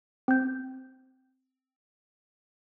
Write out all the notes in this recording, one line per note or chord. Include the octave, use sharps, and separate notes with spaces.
C4 G6